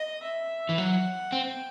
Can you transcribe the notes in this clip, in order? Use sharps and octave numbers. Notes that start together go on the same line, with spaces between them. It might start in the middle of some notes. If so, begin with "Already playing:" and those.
Already playing: D#5
E5
E3
F#3 F#5
C4 G5